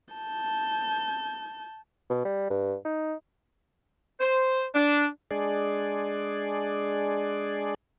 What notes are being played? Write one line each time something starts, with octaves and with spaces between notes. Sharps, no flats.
A5 G6
B2
G3
G2
D#4
C5
D4
G#3 D4 G#4 D5